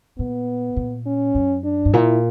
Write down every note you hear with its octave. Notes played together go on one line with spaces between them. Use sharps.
A#2 B3
A#2
C#4
F#2
D4
G2
A#2 E4